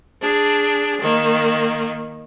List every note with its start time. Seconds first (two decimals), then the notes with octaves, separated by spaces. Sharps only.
0.21 D4 G#4
1.01 D#3 A#3